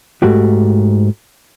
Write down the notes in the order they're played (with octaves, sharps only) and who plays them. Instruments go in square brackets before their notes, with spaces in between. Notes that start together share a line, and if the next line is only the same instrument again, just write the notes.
[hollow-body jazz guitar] G#2 A3 F#4 G4